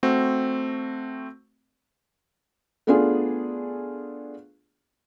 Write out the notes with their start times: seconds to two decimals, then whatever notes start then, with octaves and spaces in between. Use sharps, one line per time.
0.03 A3 C4 F#4
2.87 A3 B3 D4 F4 G#4